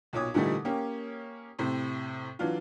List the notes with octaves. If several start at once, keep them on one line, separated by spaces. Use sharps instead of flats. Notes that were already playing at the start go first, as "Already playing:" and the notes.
B1 A#2 C#5 D6 D#6 G#6
A#2 D3 E3 G3 A3 D#4
A#3 C#4 G4
A2 C3 C5
E3 F#3 D4 F4